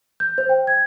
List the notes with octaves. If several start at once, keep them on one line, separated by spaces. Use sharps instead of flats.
G6
C5
G5
G#6